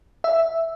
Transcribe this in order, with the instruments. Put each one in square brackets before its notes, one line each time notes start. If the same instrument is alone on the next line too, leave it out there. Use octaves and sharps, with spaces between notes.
[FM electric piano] E5